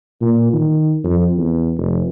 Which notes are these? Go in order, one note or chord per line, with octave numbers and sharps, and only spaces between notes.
A#2
D#3
F2
E2
F1